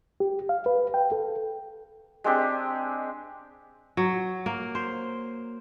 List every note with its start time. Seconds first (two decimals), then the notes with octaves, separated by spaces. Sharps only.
0.20 G4
0.49 F5
0.66 B4
0.94 G5
1.12 A4
2.24 G#3 C4 D4 G4
3.97 F#3
4.46 A#3
4.75 C5